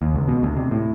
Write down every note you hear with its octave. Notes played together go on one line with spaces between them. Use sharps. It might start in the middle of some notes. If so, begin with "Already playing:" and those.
D#2
C#2
B2
D2
C3
A2